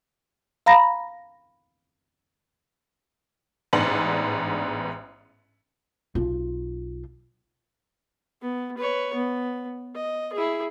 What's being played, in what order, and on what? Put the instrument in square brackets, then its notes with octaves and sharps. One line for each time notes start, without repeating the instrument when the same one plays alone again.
[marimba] F5 A#5 B5 A#6
[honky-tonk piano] A1 G#2 B3 D4 C6 F#7
[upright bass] B1 F4
[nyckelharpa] B3
B4 C#5
B3
D#5
E4 G#4